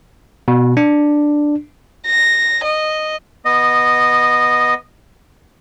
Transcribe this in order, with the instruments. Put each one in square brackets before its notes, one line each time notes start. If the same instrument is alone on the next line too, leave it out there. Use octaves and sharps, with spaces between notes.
[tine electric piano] B2
D4
[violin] A#6
D#5
[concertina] B3 D#5